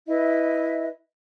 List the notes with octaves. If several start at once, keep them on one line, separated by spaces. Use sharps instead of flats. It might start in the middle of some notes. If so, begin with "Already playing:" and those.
E4 B4 D#5 E5